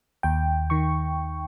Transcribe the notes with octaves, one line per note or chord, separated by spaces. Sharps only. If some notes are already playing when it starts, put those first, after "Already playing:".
D#2 G5
D#3 C#6